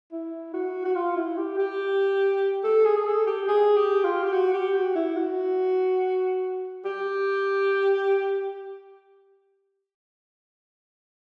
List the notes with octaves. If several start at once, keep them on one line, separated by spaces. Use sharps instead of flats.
E4
F#4
F#4
F4
E4
G4
G4
A4
G#4
G#4
A4
G4
G#4
G4
F4
G4
F#4
G4
F#4
E4
F#4
G4